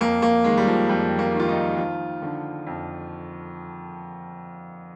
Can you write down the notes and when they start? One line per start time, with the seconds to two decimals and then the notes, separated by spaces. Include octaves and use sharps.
0.01 F2 A#3
0.22 A#3
0.44 D#3 G#3
0.57 G3
0.67 F3
0.89 F2 G3
1.19 A#3
1.34 D#3
1.40 F4
1.49 D#4
1.78 F3 F4
2.22 D3
2.67 F2